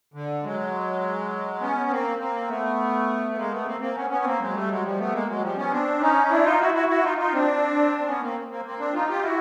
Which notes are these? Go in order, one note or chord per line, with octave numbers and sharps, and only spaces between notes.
D3
F#3 G#3
B3 C#4
A#3 C4
A#3 C4
A3 B3
B3
G#3 A#3
A3 B3
A#3 C4
A#3 C4
B3 C#4
B3 C#4
A#3 C4
F#3 G#3
G3 A3
F#3 G#3
F3 G3
A3 B3
G#3 A#3
F#3 G#3
F3 G3
B3 C#4
C4 D4
C#4 D#4
D4 E4
D#4 F4
E4 F#4
E4 F#4
E4 F#4
D#4 F4
D#4 F4
C4 D4
C4
B3 C#4
A#3 C4
A#3 C4
A#3 C4
C4 D4
D#4 F4
F4 G4
E4 F#4